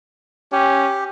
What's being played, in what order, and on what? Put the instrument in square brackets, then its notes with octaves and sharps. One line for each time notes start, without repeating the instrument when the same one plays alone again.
[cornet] C#4 [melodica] G4